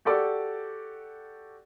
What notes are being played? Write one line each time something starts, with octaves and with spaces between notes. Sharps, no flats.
F#4 G4 A4 D5 D6